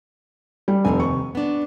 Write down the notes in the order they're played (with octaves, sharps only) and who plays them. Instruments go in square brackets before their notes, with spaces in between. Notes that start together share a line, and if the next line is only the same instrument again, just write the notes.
[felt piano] G3
[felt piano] F1 [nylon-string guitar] D#2 C3 G#5
[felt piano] C#6
[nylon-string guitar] B3 D4